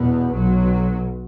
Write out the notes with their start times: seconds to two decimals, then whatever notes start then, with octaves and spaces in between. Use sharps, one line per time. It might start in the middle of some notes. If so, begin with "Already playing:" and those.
Already playing: E2 B2 B3
0.33 B1 B2 F#3